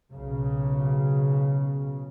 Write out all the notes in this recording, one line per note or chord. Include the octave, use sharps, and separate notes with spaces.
B1 C#3